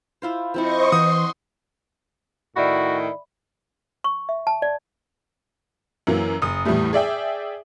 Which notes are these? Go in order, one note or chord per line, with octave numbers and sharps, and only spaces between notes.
E4 F4 C5
F3 C4 E4 C5 D#5 C#6
E3 F#5 C6 D#6
A2 D#3 E4 F#4 D5 E5 B5
C#6
E5
A5
D5
F#2 E3 F#3 A#3
F#1 D#6
E2 A2 E3 G3 A3
G#4 D5 E5 G5